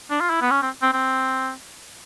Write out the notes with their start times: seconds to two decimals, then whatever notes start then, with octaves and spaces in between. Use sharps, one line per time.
0.10 D4
0.20 F4
0.30 E4
0.41 B3
0.50 C#4
0.62 C4
0.82 C4
0.93 C4